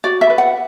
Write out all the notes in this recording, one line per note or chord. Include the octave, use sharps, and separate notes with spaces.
F#4 D5
E5
B4
F#5